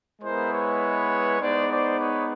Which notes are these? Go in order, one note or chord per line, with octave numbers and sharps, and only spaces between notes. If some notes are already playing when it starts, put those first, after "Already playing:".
G#3 B3 E4 A#4 C5
B4 C#5
G#3 B3 D#4 C5 D5
C5 D5
B4 C#5